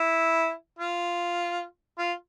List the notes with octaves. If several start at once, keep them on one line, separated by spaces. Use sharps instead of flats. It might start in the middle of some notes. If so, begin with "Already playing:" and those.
Already playing: E4
F4
F4